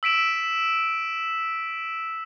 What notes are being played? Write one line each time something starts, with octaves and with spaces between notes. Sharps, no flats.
E6 B6 D7 E7